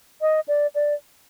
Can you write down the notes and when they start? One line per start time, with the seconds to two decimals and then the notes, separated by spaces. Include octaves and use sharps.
0.21 D#5
0.48 D5
0.75 D5